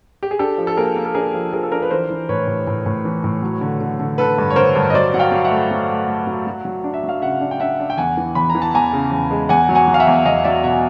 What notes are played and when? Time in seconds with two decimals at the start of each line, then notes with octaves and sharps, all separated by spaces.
0.23 G4
0.31 G#4
0.39 D4 G4 A4
0.58 F3
0.67 A4
0.77 A#3 G#4 A#4
0.96 A#3
1.05 A4
1.14 D4 G#4 A#4
1.34 F3
1.53 F3 G#4 A#4
1.63 A4
1.72 D4 A#4
1.82 B4
1.91 E3 A#4 C5
2.10 E3
2.29 A2 B4 C#5
2.47 A2
2.67 A2
2.86 A2
3.05 E3
3.24 A2
3.42 F#3
3.61 D3
3.81 D3
4.00 D3
4.18 D3 A4 B4
4.38 G2
4.50 C#5
4.56 D3 A#4 C5
4.75 G2
4.90 D#5
4.94 F#3 C5 D5
5.14 F#3 F#5
5.19 F5 G5
5.32 F#3
5.44 E5 F#5
5.51 A3
5.71 F#3
5.89 A3
6.08 A3
6.27 F#3
6.47 F#3
6.65 F#3
6.84 D4
6.94 E5
7.04 F#3
7.09 F5
7.22 C#3 E5 F#5
7.41 D4
7.51 G5
7.60 D4 E5 F#5
7.80 D4
7.90 G5
7.98 E2 F#5 G#5
8.17 E3
8.35 E2 B5
8.50 A#5
8.55 E3
8.62 A5
8.74 E2 G#5 A#5
8.93 C#3
9.12 E2
9.31 G#3
9.49 E2 F#5 G#5
9.69 F#3
9.75 F#5 G#5
9.88 F#3
9.94 F5
10.00 E5 F#5
10.07 E2
10.25 E2 D#5 F5
10.44 F#3 D5 E5
10.64 B2 E5 F#5